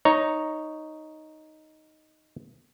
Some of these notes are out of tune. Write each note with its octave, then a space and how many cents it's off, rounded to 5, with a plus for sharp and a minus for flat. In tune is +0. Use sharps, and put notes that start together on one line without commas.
D#4 +0 C#5 +0